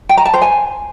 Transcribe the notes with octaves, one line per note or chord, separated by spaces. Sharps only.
G5
A#5
A5
C5
G#5